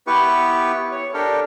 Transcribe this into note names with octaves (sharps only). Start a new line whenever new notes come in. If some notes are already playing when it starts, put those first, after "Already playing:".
B3 E4 G4 B4 C#6
C#5
D4 G4 A4 A#4